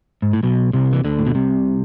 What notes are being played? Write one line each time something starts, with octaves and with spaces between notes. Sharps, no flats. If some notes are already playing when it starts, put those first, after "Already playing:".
G#2
A2
B1 B2
C2 C3
E3
D2 D3
A2
B2
C2 C3